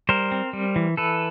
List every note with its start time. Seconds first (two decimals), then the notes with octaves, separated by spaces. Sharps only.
0.09 G3 A#4 C5
0.32 C4
0.53 G3
0.76 E3
0.97 E3 A4 B4